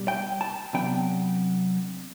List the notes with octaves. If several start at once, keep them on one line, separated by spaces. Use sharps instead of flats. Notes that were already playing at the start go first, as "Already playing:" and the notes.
Already playing: B2 G3
G5
A5
C3 F#3 B3 D4 G5